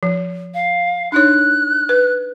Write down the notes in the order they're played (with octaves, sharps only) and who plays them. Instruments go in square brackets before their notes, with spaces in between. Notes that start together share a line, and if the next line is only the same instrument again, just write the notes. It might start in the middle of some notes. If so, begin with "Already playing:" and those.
[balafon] F3
[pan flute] F5
[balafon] D4 D#4 C#5 [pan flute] F#6
[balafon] B4